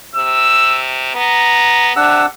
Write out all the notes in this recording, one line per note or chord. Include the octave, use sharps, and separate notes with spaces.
C3 E6
B3 A#5
C3 D4 F#5 E6